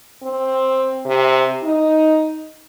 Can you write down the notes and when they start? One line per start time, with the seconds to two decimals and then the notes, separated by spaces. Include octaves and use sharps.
0.23 C4
1.05 C3
1.63 D#4